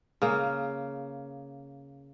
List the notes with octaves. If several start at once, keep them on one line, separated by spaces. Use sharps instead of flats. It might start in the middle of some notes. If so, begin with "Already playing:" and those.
C#3 A#3